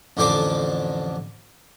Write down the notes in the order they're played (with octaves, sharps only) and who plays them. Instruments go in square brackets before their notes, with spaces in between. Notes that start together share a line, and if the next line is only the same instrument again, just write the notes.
[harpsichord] A1 F2 D3 D4 C5 D6